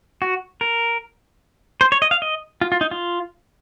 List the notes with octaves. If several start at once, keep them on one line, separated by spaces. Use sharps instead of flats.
F#4
A#4
C5
C#5
D#5
F5
D#5
F4
F4
D#4
F4